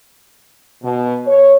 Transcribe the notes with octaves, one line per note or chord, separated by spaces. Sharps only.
B2
C#5